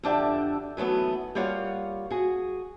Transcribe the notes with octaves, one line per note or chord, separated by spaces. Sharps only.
F2 D3 D4 G4 E5 F#5
E3 F#3 A3 B3 D#4
G3 A#3 F4 C#5 F5 F#5
F#4 G#4